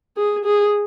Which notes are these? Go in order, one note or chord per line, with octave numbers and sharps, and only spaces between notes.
G#4
G#4